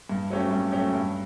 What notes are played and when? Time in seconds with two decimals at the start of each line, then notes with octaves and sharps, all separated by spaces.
0.09 G2
0.30 F#3 A3 C#4 G4
0.51 G2
0.72 F#3 A3 C#4 G4
0.93 G2